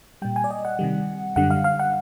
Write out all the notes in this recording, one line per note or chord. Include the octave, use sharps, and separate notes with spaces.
A#2 G3 G5
G#5
D5
D#5
F#5
C3 D#3 G3
F#2 D3 G3 F#5
F5
F5
F#5